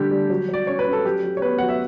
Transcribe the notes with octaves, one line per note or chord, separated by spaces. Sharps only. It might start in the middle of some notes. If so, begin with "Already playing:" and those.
Already playing: D3 G3 D4 G4
G3
F#3
F#3 D5
C#4 C#5
B4
C#4
A4
F#3 G4
F#3
C#5
B3 B4
F#3 F#5
E5